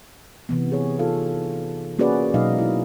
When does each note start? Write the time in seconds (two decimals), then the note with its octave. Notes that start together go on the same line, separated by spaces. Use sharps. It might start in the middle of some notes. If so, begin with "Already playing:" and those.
0.49 C3 E3 B3
0.72 G#4 C#5
0.99 D#4 F4 A4 F5
1.98 A#3 C#4 F#4 G#4 B4 D5
2.34 B2 F#3 G#3 D#4 D#5 F5
2.58 E4